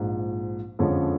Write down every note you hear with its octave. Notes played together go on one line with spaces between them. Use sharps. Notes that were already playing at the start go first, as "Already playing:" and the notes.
Already playing: A#1 G#2 F3
F2 D3 F3 G#3 C#4